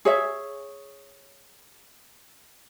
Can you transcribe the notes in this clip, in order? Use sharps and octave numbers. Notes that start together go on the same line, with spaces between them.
G#4 C#5 E5